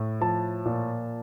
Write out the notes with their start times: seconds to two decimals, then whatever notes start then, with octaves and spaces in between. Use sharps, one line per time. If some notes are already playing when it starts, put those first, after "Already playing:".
Already playing: A2
0.21 F3 A5
0.65 A#2